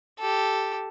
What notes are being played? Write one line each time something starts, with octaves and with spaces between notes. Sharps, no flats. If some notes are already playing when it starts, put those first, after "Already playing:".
G4 A4